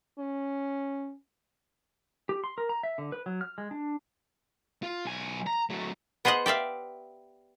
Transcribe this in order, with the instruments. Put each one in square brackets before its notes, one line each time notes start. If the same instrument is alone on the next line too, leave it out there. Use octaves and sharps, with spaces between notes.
[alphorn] C#4
[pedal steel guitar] G4
C6
A#4
A#5
E5
D3
B4
F#3
F6
G#3
D4
[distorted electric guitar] F4
B1 G#5
A#5
F#3 A3
[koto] B3 G#4 C5 D#5 F#5
G4 D5 E5 F5